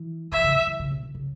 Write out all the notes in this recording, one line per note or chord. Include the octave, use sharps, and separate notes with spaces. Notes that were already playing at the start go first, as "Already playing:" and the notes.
Already playing: E3
D#3 E5
C#3
D#3
E3
C#3
B2
D#3
C#3